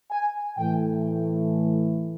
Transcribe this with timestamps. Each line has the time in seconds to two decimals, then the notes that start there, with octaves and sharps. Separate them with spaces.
0.11 G#5
0.57 A2 E3 A3 G5